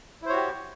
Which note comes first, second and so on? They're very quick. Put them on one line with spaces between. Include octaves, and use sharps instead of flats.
E4 C5 C#5 F#4 G4